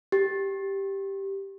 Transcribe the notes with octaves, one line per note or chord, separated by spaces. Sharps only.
G4